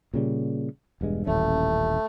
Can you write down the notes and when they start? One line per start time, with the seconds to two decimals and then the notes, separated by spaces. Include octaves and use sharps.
0.14 A#2 C#3 G3
1.01 E1 G2 G#3
1.26 D#1 A1 A3 C#4